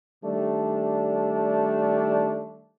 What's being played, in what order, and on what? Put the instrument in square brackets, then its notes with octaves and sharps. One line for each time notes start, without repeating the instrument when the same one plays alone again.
[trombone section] D#3 G3 A3 D4